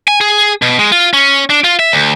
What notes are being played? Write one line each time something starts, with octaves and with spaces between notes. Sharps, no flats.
G#5
G#4
B2
G#3
F4
C#4
D4
F4
E5
D2